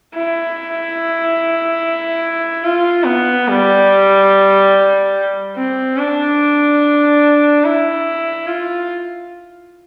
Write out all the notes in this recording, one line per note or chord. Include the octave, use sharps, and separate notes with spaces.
E4
F4
B3
G3
C4
D4
E4
F4